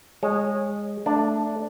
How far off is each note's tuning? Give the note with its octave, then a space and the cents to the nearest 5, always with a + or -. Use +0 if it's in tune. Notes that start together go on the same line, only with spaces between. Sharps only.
G#3 -15 C#5 -25
A3 +0 D4 +0